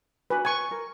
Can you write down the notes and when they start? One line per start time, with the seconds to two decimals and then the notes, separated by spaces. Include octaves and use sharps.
0.30 D4 F#4 B4 G#5
0.45 B4 G#5 C#6
0.71 A#4